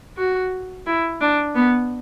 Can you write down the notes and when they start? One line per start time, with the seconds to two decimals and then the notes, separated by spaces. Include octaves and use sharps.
0.17 F#4
0.86 E4
1.21 D4
1.55 B3